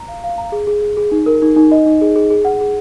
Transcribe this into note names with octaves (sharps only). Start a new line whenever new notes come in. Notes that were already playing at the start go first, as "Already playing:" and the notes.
Already playing: A#5
F5
F5
A#5
G#4
G#4
G#4
G#4
D#4
A#4
D#4
D#4
D#5
D#4
G#4
G#4
G#4
F#5
G#4